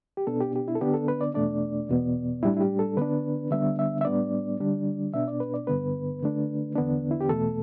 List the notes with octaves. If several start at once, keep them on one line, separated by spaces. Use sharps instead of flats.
G4
B2 B3 D4 A4
G4
G4
E4
A4
D3 B3 D4 G4
A4
B4
D5
E2 B2 A3 D4 D5
E2 B2 B3
A2 G3 D4 E4
E4
G4
A4
D3 B3 D4 B4
D3 G3 B3 D4 E5
E5
E5
A2 G3 B3 D4 D5
D3 G3 D4
B2 B3 D4 E5
D5
B4
D5
G2 D3 B3 B4
D3 A3 D4
E2 D3 B3 D4
E4
G4
E2 B2 A3 A4